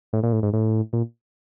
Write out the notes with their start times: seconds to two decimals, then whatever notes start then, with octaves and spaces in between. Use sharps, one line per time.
0.13 A2
0.23 A#2
0.33 A2
0.43 G#2
0.53 A2
0.93 A#2